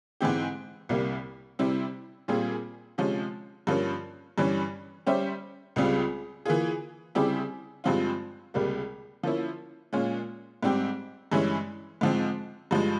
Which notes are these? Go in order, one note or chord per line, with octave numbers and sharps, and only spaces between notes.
G#2 E3 G#3 C4 G4
C2 C3 G3 A#3
C3 G3 C4 E4
A#2 G3 C4 F4 G#4
C3 F3 G#3 C#4
G2 F3 A#3 C#4
G2 E3 G3 C#4
G3 C#4 G4 C5 E5
C#2 C#3 G3 C4 F4
E3 A#3 F4 G#4
C#3 G3 C4 E4 G4
G2 F3 G#3 C4 F4
C#2 C3 G3 A#3
F3 A#3 C#4 E4
A#2 G#3 C#4 F4
G#2 G3 C4 G4
G2 E3 G#3 C#4 E4
G#2 F3 G#3 C4
G2 F3 G#3